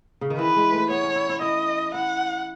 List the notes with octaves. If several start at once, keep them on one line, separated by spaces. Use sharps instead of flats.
C#3
D#3
E3 B4
G#3
A3
B3 C#5
C#4
E4
E4
E4 D#5
E4 F#5